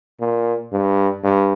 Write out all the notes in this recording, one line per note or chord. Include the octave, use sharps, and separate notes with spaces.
A#2
G2
G2